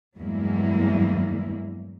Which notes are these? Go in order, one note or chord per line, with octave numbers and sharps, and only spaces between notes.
E2 G2 F#3 G#3 A#3 E4